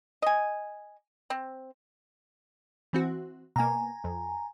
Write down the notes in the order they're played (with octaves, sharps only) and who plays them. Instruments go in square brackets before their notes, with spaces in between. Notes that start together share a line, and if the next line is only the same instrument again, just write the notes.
[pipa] D#5 G#5
C4
[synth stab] E3 C4 F#4
[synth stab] B2 A#3 [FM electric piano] G#5 A#5
[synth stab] F2